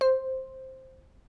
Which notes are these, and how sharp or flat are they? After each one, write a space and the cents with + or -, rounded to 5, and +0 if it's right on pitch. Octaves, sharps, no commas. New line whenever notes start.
C5 +5